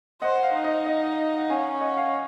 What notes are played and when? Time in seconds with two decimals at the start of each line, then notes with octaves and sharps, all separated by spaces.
0.22 C5 D#5 F#5
0.43 F5
0.54 D#4
0.64 D#5
0.86 D#5 F#5
1.37 F#5
1.49 C#4 F5 G#5
1.81 D#5 F#5
1.97 F5